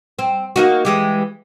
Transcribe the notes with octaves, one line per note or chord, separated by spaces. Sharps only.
C4
A#3 D#4 F#4
E3 G#3 G4